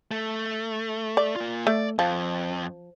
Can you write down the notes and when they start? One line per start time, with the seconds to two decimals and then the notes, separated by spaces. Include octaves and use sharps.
0.11 A3
1.17 D5
1.36 A#3 F4
1.67 A3 D5
1.99 F2 F3